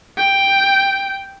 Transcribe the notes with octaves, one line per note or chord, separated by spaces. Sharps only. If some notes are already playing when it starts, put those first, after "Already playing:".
G5